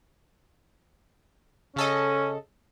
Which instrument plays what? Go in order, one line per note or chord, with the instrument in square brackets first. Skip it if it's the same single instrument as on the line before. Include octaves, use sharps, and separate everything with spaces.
[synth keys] C#3 A4 D#5 [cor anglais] C#4